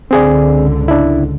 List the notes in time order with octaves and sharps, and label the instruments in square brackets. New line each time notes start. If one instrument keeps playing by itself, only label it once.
[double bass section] C#2 G#2 D3 [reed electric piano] C4 G#4 D5
[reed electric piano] D4 E4